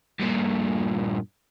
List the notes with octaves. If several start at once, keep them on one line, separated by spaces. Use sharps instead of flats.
G2 A#2